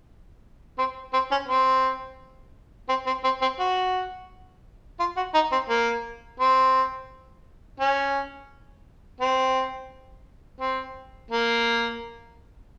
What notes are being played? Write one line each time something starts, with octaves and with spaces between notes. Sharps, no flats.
C4
C4
C#4
C4
C4
C4
C4
C4
F#4
F4
F#4
D#4
C4
A#3
C4
C#4
C4
C4
A#3